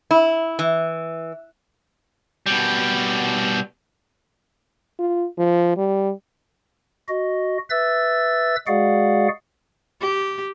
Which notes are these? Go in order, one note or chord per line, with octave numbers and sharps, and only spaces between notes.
E4
E3
B2 G3
F4
F3
G3
F#4 D#5
B4 E5 E6 A6
G#3 F#4 G#4 D5 F5 F#5
G4